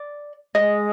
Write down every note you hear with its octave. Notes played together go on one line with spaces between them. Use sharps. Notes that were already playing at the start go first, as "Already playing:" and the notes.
Already playing: D5
G#3 D#5